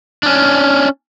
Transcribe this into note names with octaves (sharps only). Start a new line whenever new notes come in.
C#4 D4